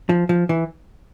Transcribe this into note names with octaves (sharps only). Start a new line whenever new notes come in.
F3
F3
E3